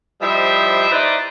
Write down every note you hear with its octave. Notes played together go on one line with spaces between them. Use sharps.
F3 G3 E4 C5 D#5 E5
D#4 E4 B4 C5 D5